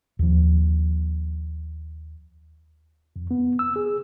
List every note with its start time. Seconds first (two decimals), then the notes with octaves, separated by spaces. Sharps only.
0.19 D#2 F3
3.16 F2
3.31 B3
3.59 E6
3.76 G#4